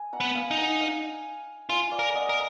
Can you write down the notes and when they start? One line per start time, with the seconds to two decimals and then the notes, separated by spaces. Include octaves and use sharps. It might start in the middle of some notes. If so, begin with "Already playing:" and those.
Already playing: G#5
0.13 F#5 A#5
0.20 B3
0.35 F5 G#5
0.51 D#4
0.58 F#5 A#5
0.81 F5 G#5
1.69 F4 F5 G#5
1.91 D5 F5
1.99 A#4
2.14 D#5 F#5
2.29 A#4